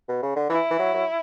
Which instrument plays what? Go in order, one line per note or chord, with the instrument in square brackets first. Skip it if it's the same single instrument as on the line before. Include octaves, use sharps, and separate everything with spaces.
[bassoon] B2
C#3
D3
[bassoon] E3 [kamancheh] E4
[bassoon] E3
F#3
F#3